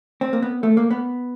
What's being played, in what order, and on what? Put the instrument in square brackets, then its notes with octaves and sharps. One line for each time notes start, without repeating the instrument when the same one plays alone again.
[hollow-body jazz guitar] C4
A#3
B3
A3
A#3
B3